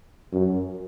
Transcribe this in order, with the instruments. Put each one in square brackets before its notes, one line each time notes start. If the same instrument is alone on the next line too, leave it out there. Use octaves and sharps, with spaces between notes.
[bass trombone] F#2